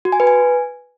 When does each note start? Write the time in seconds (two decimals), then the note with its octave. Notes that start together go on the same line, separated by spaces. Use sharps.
0.05 F#4
0.12 G#5
0.20 B4
0.27 G#5